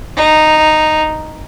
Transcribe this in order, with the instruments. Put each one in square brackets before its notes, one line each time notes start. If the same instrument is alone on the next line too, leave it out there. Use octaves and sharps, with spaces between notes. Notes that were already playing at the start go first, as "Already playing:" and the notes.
[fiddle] D#4